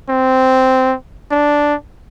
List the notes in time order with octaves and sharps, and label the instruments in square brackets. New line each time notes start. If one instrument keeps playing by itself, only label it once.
[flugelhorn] C4
D4